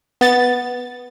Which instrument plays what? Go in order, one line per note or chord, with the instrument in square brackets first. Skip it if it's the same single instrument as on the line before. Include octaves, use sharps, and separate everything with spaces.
[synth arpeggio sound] B3 A6